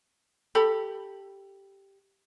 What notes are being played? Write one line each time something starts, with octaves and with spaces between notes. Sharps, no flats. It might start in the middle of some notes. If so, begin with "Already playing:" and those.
G4 A4 B5